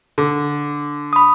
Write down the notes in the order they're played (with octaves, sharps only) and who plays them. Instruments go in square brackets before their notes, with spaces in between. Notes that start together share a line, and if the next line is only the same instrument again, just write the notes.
[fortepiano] D3
[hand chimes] B5 D#6